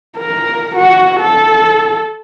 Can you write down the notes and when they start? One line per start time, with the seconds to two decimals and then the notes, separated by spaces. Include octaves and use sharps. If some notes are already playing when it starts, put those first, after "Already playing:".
0.18 A#4
0.76 F#4
1.21 A4